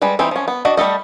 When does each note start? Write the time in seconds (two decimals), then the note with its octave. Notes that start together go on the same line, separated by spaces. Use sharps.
0.02 G3 G#3 B4
0.19 E3 C4 D#4 E4
0.31 F3 C#4
0.48 B3
0.65 D4 F#4 D#5
0.77 G3 A3 A4 D#5